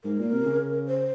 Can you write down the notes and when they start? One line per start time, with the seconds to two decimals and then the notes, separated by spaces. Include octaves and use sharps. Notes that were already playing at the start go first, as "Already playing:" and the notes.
0.04 G#2 A#4
0.19 A#2
0.32 C3
0.45 C#3
0.87 C5